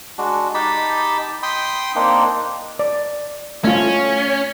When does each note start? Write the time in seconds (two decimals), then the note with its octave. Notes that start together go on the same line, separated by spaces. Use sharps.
0.18 G#3 D4 F#4
0.54 D#4 G4 A5 B5
1.43 G5 B5 C6 D#6
1.95 A#3 C4 D4 D#4
2.79 D5
3.64 A3 C#4 F4